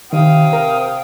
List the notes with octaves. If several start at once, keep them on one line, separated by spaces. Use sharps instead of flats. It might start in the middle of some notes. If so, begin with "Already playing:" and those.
C3 D#3 F5 G5 D#6
A#4